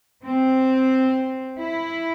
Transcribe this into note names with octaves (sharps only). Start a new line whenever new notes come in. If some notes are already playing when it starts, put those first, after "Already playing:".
C4
E4